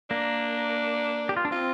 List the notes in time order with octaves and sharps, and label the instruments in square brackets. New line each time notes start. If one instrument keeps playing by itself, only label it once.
[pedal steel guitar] A#3 [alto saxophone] D4
[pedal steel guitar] G4
F4
D4
[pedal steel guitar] C4 [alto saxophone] F4